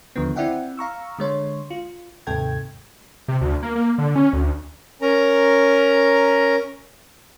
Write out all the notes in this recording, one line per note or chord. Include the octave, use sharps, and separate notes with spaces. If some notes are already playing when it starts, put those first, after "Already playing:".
D#2 D3 F3 B3
C4 E4 D5 E5 F#5 G5
F5 A#5 C#6 E6
D3 G#3 C#5 C6
F4
D#2 G#2 C3 A4 G5 G#6
C3
D2
A#3
A#3
D3
C#4
D2
C#4 A#4 A#5